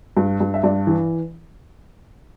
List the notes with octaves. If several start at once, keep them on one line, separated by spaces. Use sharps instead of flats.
G2
G2
E5
G2 D5
E3